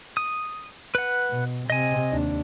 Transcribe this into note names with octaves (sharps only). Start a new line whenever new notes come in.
D#6
B4 F#5
B2
C3 D#5 G#5
D#2 D4